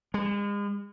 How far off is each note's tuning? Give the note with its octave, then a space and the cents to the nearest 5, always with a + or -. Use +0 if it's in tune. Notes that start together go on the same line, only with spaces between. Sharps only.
G#3 -40